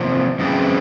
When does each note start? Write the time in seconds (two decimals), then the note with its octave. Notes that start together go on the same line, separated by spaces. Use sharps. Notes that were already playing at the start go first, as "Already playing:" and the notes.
Already playing: E2 C3 F3 A#3
0.39 F#2 C#3 E3 G#3 C4